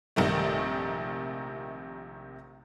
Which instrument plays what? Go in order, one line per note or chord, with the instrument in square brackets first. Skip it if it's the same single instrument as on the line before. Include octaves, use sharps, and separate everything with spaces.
[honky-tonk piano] A#1 C3 D#3 A3